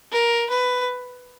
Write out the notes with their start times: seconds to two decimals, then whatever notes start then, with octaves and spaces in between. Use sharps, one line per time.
0.12 A#4
0.50 B4